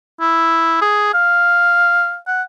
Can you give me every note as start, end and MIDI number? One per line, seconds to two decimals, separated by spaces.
0.21 0.80 64
0.81 1.14 68
1.14 2.17 77
2.27 2.42 78